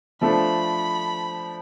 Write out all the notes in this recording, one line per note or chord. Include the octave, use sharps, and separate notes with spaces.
F3 A3 D4 B5